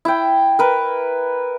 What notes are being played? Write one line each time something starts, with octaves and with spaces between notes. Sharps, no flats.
E4 G5
A#4 B4